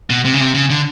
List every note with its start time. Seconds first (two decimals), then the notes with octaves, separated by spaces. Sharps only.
0.10 B2
0.25 C3
0.34 C#3
0.40 C3
0.54 C#3
0.70 D3